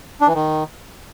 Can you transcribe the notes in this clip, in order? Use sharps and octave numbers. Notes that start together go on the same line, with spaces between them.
D4
E3
D#3